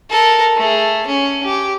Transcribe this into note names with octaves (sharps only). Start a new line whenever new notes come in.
A4 A#4
A3 G#4
C#4
G4